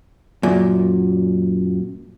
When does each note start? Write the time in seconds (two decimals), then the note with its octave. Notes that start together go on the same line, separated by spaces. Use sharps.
0.43 F#2 A#2